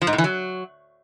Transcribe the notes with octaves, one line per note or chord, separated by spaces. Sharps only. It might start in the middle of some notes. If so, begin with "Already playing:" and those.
F3
G#2
A2
E3
F#3